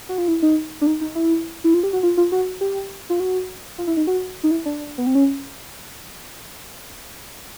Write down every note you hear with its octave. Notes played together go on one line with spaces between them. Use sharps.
F#4
F4
E4
D#4
D4
D#4
D#4
E4
E4
F4
G4
F#4
F4
F4
F#4
G4
F4
F#4
F4
E4
D#4
F#4
D#4
E4
D4
B3
C4
C#4